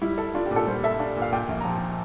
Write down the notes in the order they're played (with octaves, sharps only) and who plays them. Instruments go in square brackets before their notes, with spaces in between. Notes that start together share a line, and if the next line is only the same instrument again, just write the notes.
[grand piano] G3 [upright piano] E4
[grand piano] A4
[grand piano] D4 [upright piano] F4
[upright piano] G4
[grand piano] A#2
[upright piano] A4
[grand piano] G3 [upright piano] C5
[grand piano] A4 [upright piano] E5
[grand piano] D4 [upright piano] F5
[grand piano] A#2
[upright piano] F5
[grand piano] A#2 [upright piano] G5
[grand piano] A#1
[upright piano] A#5
[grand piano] F3 [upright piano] A5